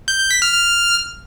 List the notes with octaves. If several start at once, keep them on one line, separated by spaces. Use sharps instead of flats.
G6
G6
B6
F6
F6